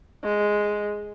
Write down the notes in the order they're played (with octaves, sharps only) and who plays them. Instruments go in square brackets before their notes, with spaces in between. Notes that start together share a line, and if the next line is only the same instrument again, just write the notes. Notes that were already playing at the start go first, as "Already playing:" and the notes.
[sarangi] G#3